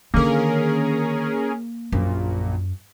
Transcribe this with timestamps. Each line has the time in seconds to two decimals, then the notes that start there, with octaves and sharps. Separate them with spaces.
0.14 D3 D#3 A#3 C#4 G#4 A#4
1.92 A#1 F#2 A#2